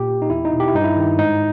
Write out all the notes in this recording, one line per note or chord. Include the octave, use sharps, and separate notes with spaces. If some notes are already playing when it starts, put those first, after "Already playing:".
Already playing: A#2 G4
D#4
E2 E4
D#4
B2
G4
E4
G2 D#4
E4
D#3
G#2 D#4